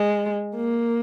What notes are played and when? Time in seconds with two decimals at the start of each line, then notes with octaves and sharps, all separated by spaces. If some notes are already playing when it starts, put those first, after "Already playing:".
Already playing: G#3
0.55 A#3